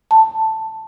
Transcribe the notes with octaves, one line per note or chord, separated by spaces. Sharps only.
A5